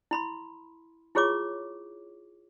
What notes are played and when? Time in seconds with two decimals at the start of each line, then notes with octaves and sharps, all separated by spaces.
0.11 E4 B5 C6
1.15 E4 F4 G#4 C#5 C#6 D6